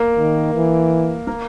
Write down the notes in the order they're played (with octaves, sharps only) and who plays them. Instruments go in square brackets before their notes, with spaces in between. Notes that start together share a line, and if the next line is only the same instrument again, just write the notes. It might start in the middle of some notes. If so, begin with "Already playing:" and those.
Already playing: [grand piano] A#3 A#4
[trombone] D#3
E3
[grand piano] A#3 A#4